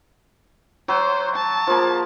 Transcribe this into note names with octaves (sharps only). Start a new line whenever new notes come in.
F#3 C5
A5
F3 A#3